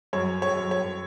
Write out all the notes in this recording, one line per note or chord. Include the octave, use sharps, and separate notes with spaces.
F#2 C#5
C#5
F#2
C#5